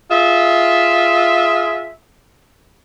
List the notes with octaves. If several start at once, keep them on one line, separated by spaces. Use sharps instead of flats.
F4 G#4 E5